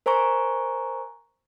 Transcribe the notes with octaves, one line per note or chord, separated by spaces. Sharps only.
A#4 C5 G#5 A#5 C#6